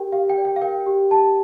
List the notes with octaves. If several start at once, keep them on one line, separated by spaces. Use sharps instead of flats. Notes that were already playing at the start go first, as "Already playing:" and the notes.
Already playing: G4 A#4 G5
G4 F5
G5
D5
G5
F5
A#4 G5
G4
G4 A5